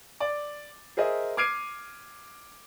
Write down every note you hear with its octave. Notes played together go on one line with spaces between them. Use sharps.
D5
G#4 A#4 C5 D#5 E5
D6 F6 G#6 C7 D7 D#7